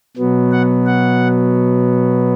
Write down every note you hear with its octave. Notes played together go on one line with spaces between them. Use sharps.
B2 F#3 B3
F#5
F#5